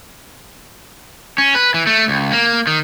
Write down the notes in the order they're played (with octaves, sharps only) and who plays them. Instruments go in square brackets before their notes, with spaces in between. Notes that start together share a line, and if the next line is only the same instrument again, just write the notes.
[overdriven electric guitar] C#4
B4
E3
A3
C#2
A#3
D#3